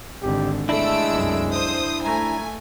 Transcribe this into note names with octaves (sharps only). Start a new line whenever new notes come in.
G#1 D3 G4
G#3 A3 D4 E4 E6 D7
C2 F#2
C5 D#6
A3 G#5 A#5